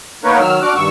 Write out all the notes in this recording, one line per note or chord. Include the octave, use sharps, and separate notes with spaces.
A#3 B3 D#4 A#4 B4 C#5
D#3 F#3 E6 F6
D4 F#4 D6 F6 F#6
G2 D#3 C#6 E6